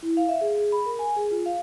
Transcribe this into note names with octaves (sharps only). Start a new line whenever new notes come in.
E4
F5
E5
G#4
G#4
B5
A#4
G#5
G#4
F4
F5